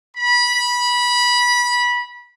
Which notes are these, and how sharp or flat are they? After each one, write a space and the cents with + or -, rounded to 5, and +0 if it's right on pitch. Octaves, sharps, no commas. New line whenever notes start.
B5 -20